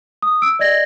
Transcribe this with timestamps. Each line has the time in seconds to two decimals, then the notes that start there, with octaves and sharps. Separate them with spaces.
0.22 D#6
0.42 E6 D7
0.59 D5 D#5 G#6 A#6